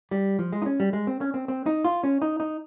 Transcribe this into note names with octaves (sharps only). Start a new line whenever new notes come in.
G3
F3
G#3
D#4
C#4
G3
G#3
C4
C#4
C4
C4
D#4
F4
C#4
D#4
D#4